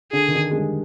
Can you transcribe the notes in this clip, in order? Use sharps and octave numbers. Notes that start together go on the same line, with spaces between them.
D3 G#4
D#3
D3
G#3
G3